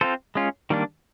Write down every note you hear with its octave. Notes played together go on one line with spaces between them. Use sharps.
C4 F4 A4 C5
G#3 C#4 F4
D#3 G3 A#3 D4